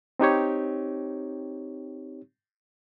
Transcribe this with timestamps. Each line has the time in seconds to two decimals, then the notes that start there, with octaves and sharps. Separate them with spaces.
0.19 C4 D#4 G4 C#5